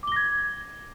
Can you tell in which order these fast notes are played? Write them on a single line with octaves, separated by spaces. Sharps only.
D6 G7 A#6 G#6